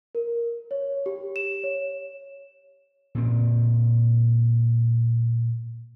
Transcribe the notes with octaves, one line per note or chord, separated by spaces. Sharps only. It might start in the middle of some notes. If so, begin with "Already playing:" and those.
A#4
C#5
G4
E7
C#5
A#2 C4